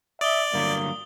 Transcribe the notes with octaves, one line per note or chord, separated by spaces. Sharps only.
D5 E5 D#6 G7
G2 D3 F#3 A#3